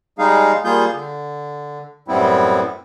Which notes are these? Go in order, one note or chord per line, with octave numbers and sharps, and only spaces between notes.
G3 G#3 D#4 G#4 F5
G3 A#3 F4 G#4 G6
D3
F#2 A2 G3 B3 C4 E4